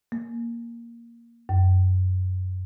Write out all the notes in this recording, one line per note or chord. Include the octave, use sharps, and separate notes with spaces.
A#3
F#2